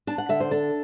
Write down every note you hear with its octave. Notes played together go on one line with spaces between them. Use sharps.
D4 A5
F#5
D3 E5
C5
D4 A4